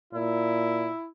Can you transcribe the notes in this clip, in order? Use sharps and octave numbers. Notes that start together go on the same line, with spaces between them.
A#2 E4